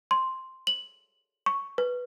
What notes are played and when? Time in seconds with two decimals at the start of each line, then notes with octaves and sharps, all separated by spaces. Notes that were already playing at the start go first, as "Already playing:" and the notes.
0.11 C6
0.67 F#7
1.46 C#6
1.78 B4